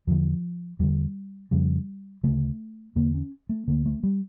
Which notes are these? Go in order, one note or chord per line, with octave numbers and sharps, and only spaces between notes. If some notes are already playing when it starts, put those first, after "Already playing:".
E2 D3 F3
E2 D3 G3
F2 C#3 G3
D2 C#3 A3
E2 D3 A#3
C#4
A3
D2 D3 A#3
A3
G3